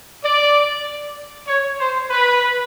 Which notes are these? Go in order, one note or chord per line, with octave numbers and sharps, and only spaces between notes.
D5
C#5
C5
B4